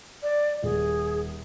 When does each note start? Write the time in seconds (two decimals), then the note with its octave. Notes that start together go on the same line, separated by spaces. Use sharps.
0.23 D5
0.63 D#1 G#4